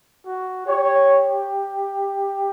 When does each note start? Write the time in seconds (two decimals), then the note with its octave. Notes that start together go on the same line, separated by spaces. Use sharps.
0.26 F#4
0.66 G4 C#5